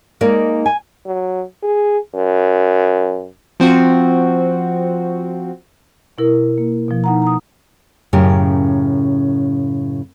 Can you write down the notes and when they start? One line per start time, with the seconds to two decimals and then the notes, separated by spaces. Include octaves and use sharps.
0.21 G#3 A#3 D#4 D5 F5
0.66 G#5
1.06 F#3
1.63 G#4
2.15 F#2
3.60 F3 C4 F#4
6.18 B2 E4 A#4
6.58 A#3
6.88 B2 F3
7.04 D#4 F#5 A#5
7.22 A#5 D#6
8.13 F#2 A2 C#3 C#4 G4 A#4